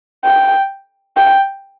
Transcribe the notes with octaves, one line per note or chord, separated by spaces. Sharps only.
G5
G5